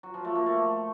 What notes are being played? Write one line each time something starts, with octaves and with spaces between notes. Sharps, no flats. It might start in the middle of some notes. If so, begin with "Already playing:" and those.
F#3
F3
A3
A#3
A3